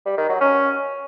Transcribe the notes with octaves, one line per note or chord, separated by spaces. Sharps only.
G3
D#3
F#3
C#4